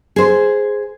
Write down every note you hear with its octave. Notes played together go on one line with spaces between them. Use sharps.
G#4 C5